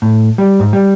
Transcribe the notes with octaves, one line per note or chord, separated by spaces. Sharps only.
A2
G3
G#2
G3